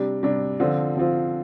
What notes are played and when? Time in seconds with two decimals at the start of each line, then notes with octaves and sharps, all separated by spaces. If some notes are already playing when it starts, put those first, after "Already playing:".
Already playing: C3 G3 D4
0.23 C3 G3 D4
0.60 D3 F3 C4 F4
0.97 D3 F3 C4 F4